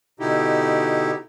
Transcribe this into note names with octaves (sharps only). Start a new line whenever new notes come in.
B2 D3 D#4 E4 G4